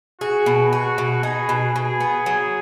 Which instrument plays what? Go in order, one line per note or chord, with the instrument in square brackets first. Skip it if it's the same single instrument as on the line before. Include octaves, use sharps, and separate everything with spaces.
[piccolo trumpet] F#4 [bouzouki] G#4
[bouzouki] B2
[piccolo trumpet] F#4 [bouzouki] G#4
[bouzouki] B2
[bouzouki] D#4 [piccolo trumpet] G#4
[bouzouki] B2
[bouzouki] B2 [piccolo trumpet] G#4
[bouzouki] B3
[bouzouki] F#3 [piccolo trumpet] G#4